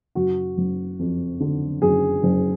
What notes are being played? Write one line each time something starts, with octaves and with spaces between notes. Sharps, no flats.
F#1 F#4
F#1
F2
D3
F#1 G#4
F#1